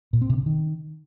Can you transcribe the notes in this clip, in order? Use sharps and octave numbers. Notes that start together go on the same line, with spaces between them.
A#2
C4
C3
C#3
D#3